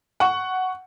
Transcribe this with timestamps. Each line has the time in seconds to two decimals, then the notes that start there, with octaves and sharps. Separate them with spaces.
0.20 F#5 C#6